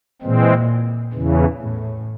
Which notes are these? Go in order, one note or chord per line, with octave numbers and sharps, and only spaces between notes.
A#2 E3 G#3 C4
E2 C#3 E3
A2